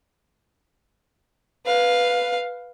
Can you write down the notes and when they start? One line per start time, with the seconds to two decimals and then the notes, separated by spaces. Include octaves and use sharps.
1.66 B4 F5